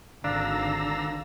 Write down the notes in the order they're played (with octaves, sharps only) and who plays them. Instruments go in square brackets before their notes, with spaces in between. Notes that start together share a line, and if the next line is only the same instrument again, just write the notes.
[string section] G#1 [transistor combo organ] D3 A#5 E6 [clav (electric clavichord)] D4 [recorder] F5